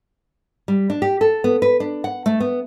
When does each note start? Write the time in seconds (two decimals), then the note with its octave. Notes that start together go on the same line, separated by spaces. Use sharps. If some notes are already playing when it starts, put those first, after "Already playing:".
0.68 G3
0.90 D4
1.02 G4
1.21 A4
1.44 B3
1.62 B4
1.80 D4
2.04 F#5
2.26 A3
2.40 B3